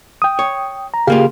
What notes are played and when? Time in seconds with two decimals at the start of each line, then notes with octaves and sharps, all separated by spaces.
0.22 G5 D#6
0.39 C#5
0.94 A#5
1.07 C#3 A#3 F4 G4 G#4 F5